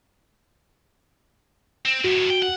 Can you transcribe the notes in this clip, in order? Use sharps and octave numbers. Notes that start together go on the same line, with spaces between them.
C4
F#2 A2 F#4
G5
F#5